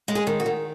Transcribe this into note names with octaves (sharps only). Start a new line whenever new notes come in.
G#3
G#4
D#3
F#4
D#3